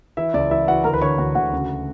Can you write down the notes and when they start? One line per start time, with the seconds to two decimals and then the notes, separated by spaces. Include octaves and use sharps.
0.17 E3 E4 E5
0.34 C#2 D5
0.50 E3 E4 E5
0.68 E3 F#4 F#5
0.84 D2 A#4 A#5
0.93 B4 B5
1.01 D3 C#5 C#6
1.18 D2 F#4 F#5
1.35 D2 F#4 F#5
1.53 C#3